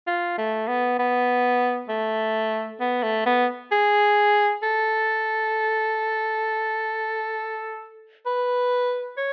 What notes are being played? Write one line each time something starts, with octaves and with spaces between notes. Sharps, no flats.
F4
A3
B3
B3
A3
B3
A3
B3
G#4
A4
B4
C#5